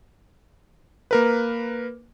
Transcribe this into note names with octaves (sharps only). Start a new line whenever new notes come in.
A#3 A#4 B4